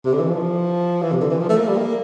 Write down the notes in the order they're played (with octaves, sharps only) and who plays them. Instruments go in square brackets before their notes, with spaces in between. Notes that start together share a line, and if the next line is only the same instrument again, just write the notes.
[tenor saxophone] C3
D3
E3
F3
E3
C3
D3
E3
F3
A3
A#3
G3
A#3